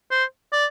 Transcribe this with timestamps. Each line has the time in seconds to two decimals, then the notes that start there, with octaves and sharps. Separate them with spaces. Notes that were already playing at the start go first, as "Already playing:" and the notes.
0.11 C5
0.53 D5